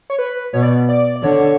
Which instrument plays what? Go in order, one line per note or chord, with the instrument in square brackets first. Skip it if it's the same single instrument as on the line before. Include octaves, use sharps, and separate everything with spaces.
[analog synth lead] C#5
B4
[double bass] B2 [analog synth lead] C#5
[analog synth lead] D5
D5
D5
[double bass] D3 [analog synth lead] C#5